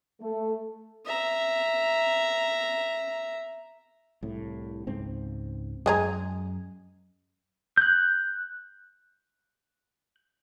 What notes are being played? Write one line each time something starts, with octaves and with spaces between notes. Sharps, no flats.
A3
E5 A#5
C2 A2
C#2 G#2 C4
F#2 G#3 G#4 A#5
F#6 G6